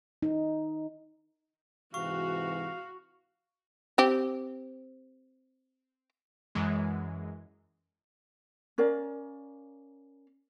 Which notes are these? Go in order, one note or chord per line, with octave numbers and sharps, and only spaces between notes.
D#4
G#2 C3 E3 F#4 F5 C#6
C4 G4
F#2 E3 G#3
C#4 A#4 D5 F5